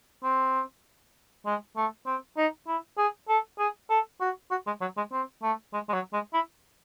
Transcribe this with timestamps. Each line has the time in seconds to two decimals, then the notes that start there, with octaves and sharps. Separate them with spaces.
0.23 C4
1.46 G#3
1.77 A3
2.06 C4
2.37 D#4
2.67 E4
2.98 G#4
3.28 A4
3.59 G#4
3.90 A4
4.21 F#4
4.51 F#4
4.67 G#3
4.81 F#3
4.97 G#3
5.12 C4
5.42 A3
5.73 G#3
5.89 G#3
5.93 F#3
6.13 G#3
6.33 E4